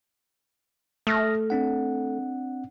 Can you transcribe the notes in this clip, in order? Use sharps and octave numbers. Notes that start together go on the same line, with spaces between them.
A3 D#6 F6 A#6
C4 D4 F#5